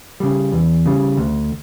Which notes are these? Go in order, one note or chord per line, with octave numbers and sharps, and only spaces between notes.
C#3 G3
E2
C#3 G3
D2